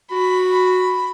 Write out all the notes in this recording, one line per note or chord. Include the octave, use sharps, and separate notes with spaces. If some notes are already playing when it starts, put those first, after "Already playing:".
F#4 B5